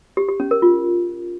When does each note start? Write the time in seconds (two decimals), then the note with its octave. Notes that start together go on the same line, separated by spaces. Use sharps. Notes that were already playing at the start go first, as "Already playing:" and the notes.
0.17 G4
0.28 G4
0.40 C#4
0.51 A#4
0.62 F4